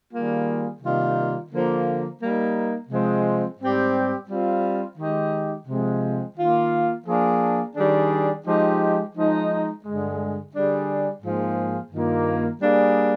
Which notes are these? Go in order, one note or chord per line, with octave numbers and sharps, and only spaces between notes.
D#3 G3 A#3 F4 G#4
C3 D#3 G3 A#3 F4
D3 F3 A#3
G3 A#3 D#4
C3 F3 G#3 C4
G#2 G3 C4 G4
G3 C4 F4
D#3 G#3 D#4 G4
C3 F3 G#3 C4
D#3 A#3 F4
F3 A#3 D4 G#4
D#3 G3 D4 G#4
F3 G#3 D#4 G4
F3 G#3 D#4
G2 D3 G#3
D3 G3 D4 G#4
G#2 F3 A#3 F4 G#4
G2 D#3 A#3 F4
G3 A#3 D4 G#4